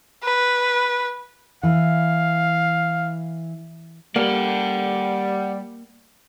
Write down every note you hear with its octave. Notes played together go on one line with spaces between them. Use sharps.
B4
E3 F5
G3 A#3 D5 F#5